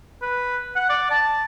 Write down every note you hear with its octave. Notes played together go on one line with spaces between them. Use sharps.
B4
F#5
D5
A5